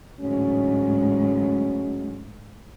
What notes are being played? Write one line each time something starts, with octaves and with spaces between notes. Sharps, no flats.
A1 D2 G#2 F#3 G#3 C#4